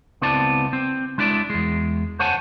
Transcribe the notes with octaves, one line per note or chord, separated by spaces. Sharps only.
C#2 B3 C4 E4 D5 A5
C4
G#3 D4 E4 D5
E2 G#3
C5 C#5 F#5 G#5 A5